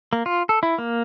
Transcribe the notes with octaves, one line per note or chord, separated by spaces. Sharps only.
A#3
F4
A4
E4
A#3